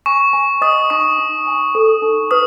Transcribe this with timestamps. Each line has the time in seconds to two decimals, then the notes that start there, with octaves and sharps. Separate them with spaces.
0.06 G#5 C#6
0.33 G#5
0.62 D#5 D#6
0.90 D#4 C#6
1.18 D#4
1.47 G#5
1.75 A4
2.02 D#4
2.31 B4 D#6